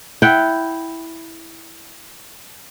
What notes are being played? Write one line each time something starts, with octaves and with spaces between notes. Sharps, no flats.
E4 F#5 G5